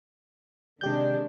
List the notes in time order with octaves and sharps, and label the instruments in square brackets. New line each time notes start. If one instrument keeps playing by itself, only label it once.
[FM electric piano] C3 G4 G6 [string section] D#3 G#3 D4